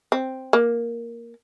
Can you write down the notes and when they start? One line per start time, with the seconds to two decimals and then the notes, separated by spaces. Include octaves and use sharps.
0.12 C4
0.53 A#3